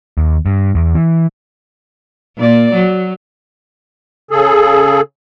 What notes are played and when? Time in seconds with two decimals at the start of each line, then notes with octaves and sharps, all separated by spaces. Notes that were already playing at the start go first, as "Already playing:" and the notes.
0.18 D#2
0.46 G2
0.75 E2
0.95 E3
2.38 A#2 D5
2.74 F#3
4.31 C#3 G#4 A4